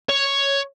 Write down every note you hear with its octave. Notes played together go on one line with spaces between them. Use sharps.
C#5